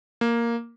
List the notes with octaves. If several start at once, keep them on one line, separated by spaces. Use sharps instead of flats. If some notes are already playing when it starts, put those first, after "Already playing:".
A#3